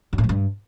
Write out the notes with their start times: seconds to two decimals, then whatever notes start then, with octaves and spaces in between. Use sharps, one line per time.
0.13 F#2
0.18 A2
0.24 F3
0.29 G2